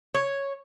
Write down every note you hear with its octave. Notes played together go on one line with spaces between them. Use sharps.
C#5